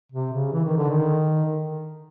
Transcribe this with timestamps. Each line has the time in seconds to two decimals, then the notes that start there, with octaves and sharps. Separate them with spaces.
0.12 C3
0.33 C#3
0.52 E3
0.64 D#3
0.77 D3
0.90 D#3